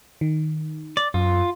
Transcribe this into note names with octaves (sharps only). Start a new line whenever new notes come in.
D#3
D5
F#2 F4